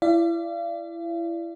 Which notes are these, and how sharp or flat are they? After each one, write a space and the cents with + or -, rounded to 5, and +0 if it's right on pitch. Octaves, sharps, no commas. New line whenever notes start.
E4 +25 D5 +0 F5 -40